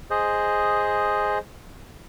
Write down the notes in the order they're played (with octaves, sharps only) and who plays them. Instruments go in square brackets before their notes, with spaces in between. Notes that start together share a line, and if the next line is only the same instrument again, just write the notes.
[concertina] G#4 C5 D#5